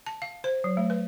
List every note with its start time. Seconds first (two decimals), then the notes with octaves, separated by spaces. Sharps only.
0.06 A5
0.22 F5
0.44 C5
0.64 F#3
0.77 A3
0.90 B4